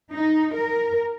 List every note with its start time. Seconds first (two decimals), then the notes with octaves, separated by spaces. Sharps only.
0.13 D#4
0.55 A#4